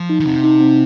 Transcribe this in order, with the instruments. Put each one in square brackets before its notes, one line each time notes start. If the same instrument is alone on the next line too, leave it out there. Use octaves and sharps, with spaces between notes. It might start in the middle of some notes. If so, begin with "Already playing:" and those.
Already playing: [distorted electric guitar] F3
[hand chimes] D#4
[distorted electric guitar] D#3
[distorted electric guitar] C3 [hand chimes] C4
[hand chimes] D#4
C4